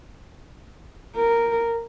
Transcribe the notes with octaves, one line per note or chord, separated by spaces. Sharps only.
A#4